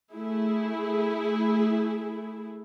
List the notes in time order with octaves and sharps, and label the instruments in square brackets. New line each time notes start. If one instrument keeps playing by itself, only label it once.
[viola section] A3 E4 G#4